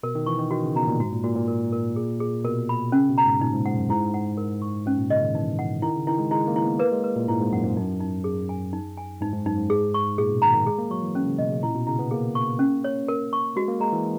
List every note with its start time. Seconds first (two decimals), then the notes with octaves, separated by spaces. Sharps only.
0.03 B2 A#4
0.15 D#3
0.26 E3 C#6
0.39 D#3
0.51 D#3 F#4
0.63 C#3
0.75 B2 A#5
0.88 A#2
0.99 G#2 F#4
1.12 A#2
1.24 A#2 F#4
1.36 A#2
1.48 A#4
1.73 A#4
1.96 G#4
2.20 G#4
2.45 B2 A#4
2.69 B5
2.92 C#3 C#4
3.09 B2
3.18 A#5
3.25 G#2
3.41 A#2 D#4
3.53 G#2
3.66 G#2 F#5
3.77 F#2
3.89 G#2 E4
4.14 F#5
4.37 A#4
4.62 C#6
4.86 G#2 C#4
4.98 A#2
5.10 C#3 D#5
5.22 D#3
5.35 E3 D#4
5.59 F#5
5.82 D#3 E4
5.95 C#3
6.07 D#3 E4
6.19 G#3
6.31 G#3 E4
6.47 A#3
6.56 E4
6.64 B3
6.79 A#3 B4
6.92 G#3
7.04 B4
7.16 A#2
7.28 G#2 E4
7.40 G#2
7.52 F#2 F#5
7.64 G#2
7.77 F#2 D#4
8.00 D#4
8.24 G#4
8.49 G#5
8.73 D#4
8.97 G#5
9.21 G#2 D#4
9.33 G#2
9.45 F#2 D#4
9.58 G#2
9.70 G#4
9.94 C#6
10.18 A#2 G#4
10.30 B2
10.42 D#3 A#5
10.54 D#3
10.66 G#3 G#4
10.78 A#3
10.91 F#3 C#6
11.02 E3
11.15 C#4
11.27 C#3
11.38 B2 D#5
11.51 C#3
11.63 A#2 E4
11.75 B2
11.87 C#3 E4
11.99 B3
12.11 A#3 G#4
12.35 C#6
12.59 C#4
12.84 C#5
13.08 A#4
13.33 C#6
13.56 G#3 F#4
13.68 A#3
13.80 G#3 A#5
13.93 E3